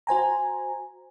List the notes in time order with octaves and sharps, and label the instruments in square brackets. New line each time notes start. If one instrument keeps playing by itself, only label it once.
[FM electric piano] F#4 C5 G#5 A#5